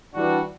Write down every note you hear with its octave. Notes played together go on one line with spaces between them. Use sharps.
E3 G3 D4 F#4